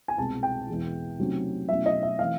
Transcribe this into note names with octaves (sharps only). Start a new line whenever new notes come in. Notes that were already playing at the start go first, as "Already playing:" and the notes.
G#5
C2 B2 G#3 A5
G5
E2 B2 G#3 B3 E4
C3 D#3 F#3 A3 C#4
B2 F#3 A3 C#4 E4 E5
D#5
E5
E3 A3 C4 F5